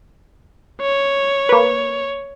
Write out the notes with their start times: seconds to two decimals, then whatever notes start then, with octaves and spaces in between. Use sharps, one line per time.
0.82 C#5
1.49 A#3 B4